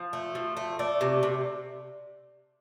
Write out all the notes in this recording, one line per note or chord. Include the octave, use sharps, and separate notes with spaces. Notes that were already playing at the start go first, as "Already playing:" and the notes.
Already playing: F3
A3
F3
A3
A3 D5
C3
C3